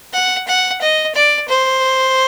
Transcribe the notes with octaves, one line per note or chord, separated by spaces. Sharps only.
F#5
F#5
D#5
D5
C5